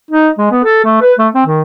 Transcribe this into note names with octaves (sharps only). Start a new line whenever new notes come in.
D#4
G#3
B3
A4
A3
B4
A3
C4
D#3